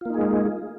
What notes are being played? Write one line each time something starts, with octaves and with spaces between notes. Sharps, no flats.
G#3 A#3 D#4 F4 G#4